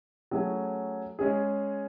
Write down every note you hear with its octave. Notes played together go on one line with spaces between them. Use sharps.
F#3 A3 C#4 G#4
G#3 C#4 G#4